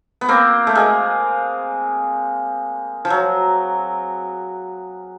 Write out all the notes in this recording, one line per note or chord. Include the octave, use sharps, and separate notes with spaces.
B3
A#3 C4
A3
G#3 A#3
F3
F#3